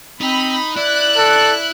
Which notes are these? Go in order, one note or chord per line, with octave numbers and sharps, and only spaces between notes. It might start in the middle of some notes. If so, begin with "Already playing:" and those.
C4 D#4 B5
E4 D5 F#6
A4